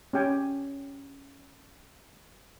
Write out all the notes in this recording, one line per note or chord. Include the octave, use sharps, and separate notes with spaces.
C#4 G4 G5 G#5